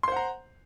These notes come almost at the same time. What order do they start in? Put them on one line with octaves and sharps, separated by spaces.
C6 C5 F#5 A#5